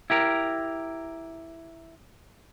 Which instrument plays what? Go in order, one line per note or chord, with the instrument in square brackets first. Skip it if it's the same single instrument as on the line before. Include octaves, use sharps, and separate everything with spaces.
[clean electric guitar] E4 G4 A#4